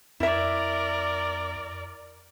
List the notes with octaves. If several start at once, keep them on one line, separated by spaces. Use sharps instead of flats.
F2 E4 A#4 D5 E5